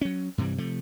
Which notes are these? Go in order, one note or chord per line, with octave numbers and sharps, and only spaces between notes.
F#3 C#4
G2 C3 E3 G3
C3 F3 A3